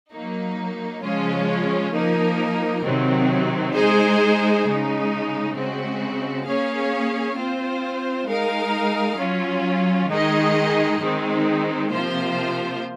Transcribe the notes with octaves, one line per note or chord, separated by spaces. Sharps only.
F#3 A#3 D#4
C#3 F3 G#3 C#4 F4
F3 A#3 D#4 A#4
C3 D#3 F#3 C4
G#3 D#4 G#4 C5
C#3 G#3 D#4
C#3 G#3 C4 F#4
A#3 C#4 G#4 C#5 F5
C4 F4 C5
G#3 D#4 A#4 F5
F#3 C#4 F4
D#3 G#3 D#4 G#4 D#5
D#3 G#3 C4 D#4
C3 F3 A#3 F4 C5